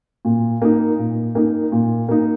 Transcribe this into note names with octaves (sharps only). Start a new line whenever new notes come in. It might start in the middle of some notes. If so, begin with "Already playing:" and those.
A#2
A#3 D#4
A#2
A#3 D#4
A#2
A#3 D#4